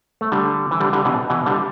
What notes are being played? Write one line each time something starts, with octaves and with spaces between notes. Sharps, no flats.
A3
D3 G3
E3
D3 G3
D3 G3
B2 E3
B2 E3
D3 G3